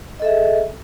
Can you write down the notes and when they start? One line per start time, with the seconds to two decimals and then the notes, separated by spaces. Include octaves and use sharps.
0.19 D#5
0.22 A4
0.25 E5
0.27 G#4